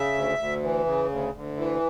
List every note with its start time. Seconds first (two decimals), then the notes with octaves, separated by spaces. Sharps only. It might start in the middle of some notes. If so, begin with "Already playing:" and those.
Already playing: C#3 E5
0.14 D2
0.38 D2
0.62 E3
0.86 C#3
1.10 D2
1.34 D2
1.57 E3